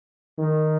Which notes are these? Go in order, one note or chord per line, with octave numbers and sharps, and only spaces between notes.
D#3